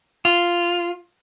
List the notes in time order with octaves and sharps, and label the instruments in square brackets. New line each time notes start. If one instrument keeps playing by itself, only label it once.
[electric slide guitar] F4